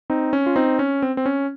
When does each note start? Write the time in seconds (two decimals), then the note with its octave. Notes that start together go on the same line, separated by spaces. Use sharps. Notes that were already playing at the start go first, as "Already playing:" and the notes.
0.10 C4 D#4
0.33 C#4
0.46 F4
0.56 C4 D#4
0.79 C#4
1.02 C4
1.17 C4
1.26 C#4